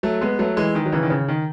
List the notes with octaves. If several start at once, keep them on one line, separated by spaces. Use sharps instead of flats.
F#3 A3
G#3 B3
F#3 A3
E3 G#3
D#3
F#3
C#3 E3
D#3
C#3
D#3